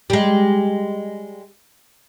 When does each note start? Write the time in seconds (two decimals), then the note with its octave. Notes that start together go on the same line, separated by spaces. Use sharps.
0.10 G3 G#3